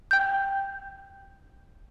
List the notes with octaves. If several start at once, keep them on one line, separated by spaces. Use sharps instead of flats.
G5 G6